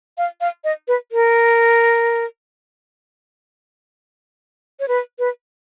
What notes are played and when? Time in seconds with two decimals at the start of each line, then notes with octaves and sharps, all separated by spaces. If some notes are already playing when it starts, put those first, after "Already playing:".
0.18 F5
0.41 F5
0.64 D#5
0.88 B4
1.12 A#4
4.80 C#5
4.88 B4
5.19 B4